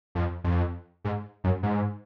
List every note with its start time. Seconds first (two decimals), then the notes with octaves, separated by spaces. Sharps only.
0.15 F2
0.44 F2
1.05 G#2
1.44 F#2
1.63 G#2